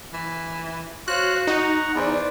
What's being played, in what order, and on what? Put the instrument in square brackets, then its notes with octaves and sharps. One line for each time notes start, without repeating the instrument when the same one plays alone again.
[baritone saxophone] E3
[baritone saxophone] F#4 [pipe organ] C5 C#5 F5 [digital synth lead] F#6
[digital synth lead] D#4 [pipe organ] F#5 A#5 C#6
[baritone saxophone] E2 [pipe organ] B4 C5 D5